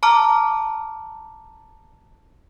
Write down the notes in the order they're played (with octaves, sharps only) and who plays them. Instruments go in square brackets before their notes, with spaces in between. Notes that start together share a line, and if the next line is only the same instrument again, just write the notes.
[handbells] A5 A#5 D6 F6